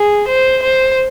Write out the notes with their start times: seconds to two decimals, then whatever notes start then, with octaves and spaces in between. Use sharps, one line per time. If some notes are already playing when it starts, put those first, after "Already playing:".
Already playing: G#4
0.28 C5
0.63 C5